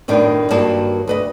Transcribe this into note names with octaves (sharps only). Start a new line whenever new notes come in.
F#2 A2 D#3 B3 D4
G2 D#3 F#3 A#3 A5
D2 B4 D#5